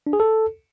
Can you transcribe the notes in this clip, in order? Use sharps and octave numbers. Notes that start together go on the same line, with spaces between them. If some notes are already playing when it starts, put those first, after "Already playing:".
D4
G#4
A4